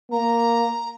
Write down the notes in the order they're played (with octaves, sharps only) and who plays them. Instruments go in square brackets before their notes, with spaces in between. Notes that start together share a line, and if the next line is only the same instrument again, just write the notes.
[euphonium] A#3 [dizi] A#5